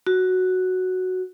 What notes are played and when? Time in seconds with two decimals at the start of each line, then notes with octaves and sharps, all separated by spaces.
0.07 F#4